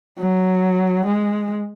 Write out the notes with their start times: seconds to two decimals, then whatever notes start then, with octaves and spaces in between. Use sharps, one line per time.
0.19 F#3
1.06 G#3